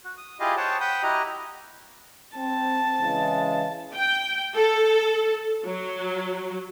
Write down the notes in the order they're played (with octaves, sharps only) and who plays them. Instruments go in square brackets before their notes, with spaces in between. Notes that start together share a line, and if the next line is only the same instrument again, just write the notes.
[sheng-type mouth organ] F#4
D#6
E4 F4 G4 G#4 D#5 F5
C5 C#5 F#5 G5 A5
F#5 G5 B5 D#6 G6
E4 F#4 G4 D#5 A#5
[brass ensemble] C4 [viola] A5
[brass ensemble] C#3 E3 G#3
[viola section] G5
A4
F#3